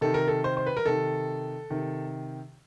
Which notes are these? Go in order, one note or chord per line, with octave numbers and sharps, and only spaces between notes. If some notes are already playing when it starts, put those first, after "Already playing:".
C3 D#3 A4
A#4
A4
C5
C5
B4
A#4
C3 D#3 A4
C3 D#3